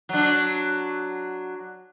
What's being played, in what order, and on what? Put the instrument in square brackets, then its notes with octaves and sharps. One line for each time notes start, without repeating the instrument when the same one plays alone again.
[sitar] F#3 D4